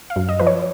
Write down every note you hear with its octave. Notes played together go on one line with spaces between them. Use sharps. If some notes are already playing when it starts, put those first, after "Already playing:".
F5
F#2
D#5
F3 B4
C#5